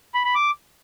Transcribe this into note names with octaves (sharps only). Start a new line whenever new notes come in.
B5
B5
D6